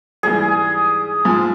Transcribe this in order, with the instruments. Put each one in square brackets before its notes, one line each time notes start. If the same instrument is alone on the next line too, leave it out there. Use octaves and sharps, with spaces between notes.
[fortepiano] G#2 E3 G3 [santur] G#4
[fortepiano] G#2 F3 G#5